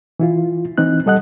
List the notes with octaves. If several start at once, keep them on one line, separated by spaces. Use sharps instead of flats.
E3 E4 F4
E3 C4 D#4 F#6
G3 A4 D#5 F#5 F#6